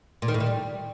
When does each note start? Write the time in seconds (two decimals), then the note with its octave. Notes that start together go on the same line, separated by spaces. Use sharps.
0.22 A#2
0.28 D#3
0.34 A2
0.40 D#3
0.46 G3